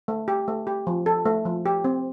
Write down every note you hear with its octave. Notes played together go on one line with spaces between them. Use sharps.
A3
G4
A3
G4
F3
A4
A3
F3
G4
C4